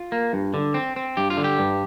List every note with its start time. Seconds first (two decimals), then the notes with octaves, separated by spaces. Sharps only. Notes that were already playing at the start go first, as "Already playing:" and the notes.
Already playing: F4
0.12 A#3
0.33 G2
0.54 D3
0.74 C4
0.96 C4
1.17 G2 G4
1.30 F4
1.37 D3
1.44 G4
1.59 G2